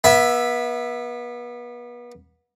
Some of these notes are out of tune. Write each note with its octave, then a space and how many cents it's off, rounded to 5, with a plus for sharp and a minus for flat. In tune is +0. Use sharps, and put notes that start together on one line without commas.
B3 -35 E5 +0